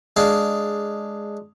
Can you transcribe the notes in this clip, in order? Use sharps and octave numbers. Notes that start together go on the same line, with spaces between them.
G#3 D4 F5